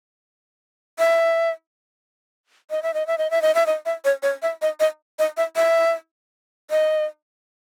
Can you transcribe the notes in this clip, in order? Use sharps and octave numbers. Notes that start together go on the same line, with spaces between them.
E5
D#5
E5
D#5
E5
D#5
E5
D#5
E5
D#5
E5
C#5
C#5
E5
D#5
D#5
D#5
E5
E5
D#5